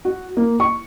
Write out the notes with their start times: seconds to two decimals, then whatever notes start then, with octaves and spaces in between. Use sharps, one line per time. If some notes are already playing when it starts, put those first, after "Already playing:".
0.05 F#4
0.37 A#3
0.60 C#6